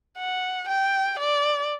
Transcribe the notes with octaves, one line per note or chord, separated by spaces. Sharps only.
F#5
G5
D5